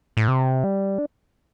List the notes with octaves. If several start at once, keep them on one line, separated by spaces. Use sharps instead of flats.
A2
C3
G3
D4